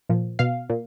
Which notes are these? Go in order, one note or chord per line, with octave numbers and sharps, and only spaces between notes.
A#2 F3
B2 F5
A#2